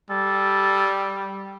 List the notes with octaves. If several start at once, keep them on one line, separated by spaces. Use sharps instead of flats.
G3 A4